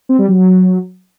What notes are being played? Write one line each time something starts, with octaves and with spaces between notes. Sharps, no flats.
C4
G3
F#3